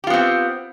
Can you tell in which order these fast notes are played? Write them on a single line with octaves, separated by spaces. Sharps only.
G4 F4 B3 C4